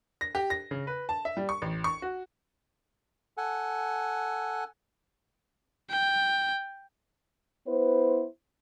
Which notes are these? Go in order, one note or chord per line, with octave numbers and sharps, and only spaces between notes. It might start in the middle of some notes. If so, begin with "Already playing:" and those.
A#6
G4
A#6
C#3
B4
A5
E5
G3
C#6
A1
C#6
F#4
A4 F#5 G#5
G5
B3 E4 B4 C5